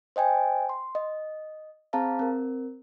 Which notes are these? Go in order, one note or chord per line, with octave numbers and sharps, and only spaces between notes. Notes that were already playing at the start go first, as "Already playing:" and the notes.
C5 D#5 G5 G#5
C6
D#5
C4 G#4 C5 F5 A5 A#5
C4 A#4